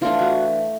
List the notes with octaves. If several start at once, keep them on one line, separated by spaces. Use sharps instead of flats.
E3 A3 D4 F4
F#4